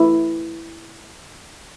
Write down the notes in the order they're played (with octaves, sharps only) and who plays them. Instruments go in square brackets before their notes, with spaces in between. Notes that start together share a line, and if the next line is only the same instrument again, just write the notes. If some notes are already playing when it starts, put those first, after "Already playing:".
Already playing: [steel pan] E4